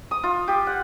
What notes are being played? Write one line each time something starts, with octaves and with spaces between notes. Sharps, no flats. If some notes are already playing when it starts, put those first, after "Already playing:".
D#6
F4
G4
F#5